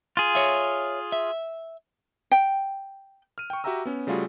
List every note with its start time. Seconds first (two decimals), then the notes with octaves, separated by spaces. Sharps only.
0.17 F4 G#4
0.35 C#5 E5
1.12 E5
2.31 G5
3.38 F6 D#7
3.50 G5 C#6
3.64 F#4 G4 E5 G5 A#5 E6
3.85 B3 C#4
4.07 C#3 G3 A3 F4 F#4 G#4